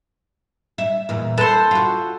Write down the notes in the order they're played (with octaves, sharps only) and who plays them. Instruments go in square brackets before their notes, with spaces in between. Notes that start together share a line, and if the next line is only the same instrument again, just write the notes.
[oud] E5
E2 A#2
[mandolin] A4 C5 [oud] B4
[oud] F4 F#4